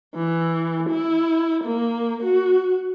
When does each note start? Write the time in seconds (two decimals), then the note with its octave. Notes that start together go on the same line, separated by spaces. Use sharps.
0.14 E3
0.89 E4
1.64 A#3
2.23 F#4